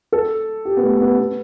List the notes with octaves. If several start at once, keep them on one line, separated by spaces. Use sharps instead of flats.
A4
G4
B3
A3
B3
B3